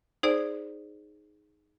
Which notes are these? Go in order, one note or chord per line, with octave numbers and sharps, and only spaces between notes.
D#4 G#4 C5 D5